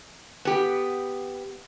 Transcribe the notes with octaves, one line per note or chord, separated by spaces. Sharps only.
B3 G4